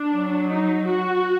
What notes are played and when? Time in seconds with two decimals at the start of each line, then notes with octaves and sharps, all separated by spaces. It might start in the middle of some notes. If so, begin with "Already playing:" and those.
Already playing: D4
0.14 F#3
0.50 D#4
0.87 F#4